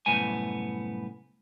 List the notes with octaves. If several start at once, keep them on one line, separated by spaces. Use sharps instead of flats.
C2 F#2 A2 B3 G#5